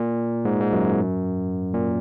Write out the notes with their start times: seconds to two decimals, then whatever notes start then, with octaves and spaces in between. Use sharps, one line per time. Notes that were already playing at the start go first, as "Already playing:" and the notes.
Already playing: A#2
0.45 G#2
0.61 G#2
0.73 F#2
1.73 A#2